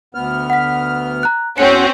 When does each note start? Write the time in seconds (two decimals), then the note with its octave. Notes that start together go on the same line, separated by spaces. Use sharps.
0.15 D2 B3 F6
0.50 F#5 B6
1.23 A#5 F#6
1.58 E2 C4 C#4 F#4 F#6 C#7